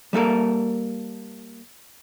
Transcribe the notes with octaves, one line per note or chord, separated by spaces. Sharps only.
G3 A#3 A4 A#4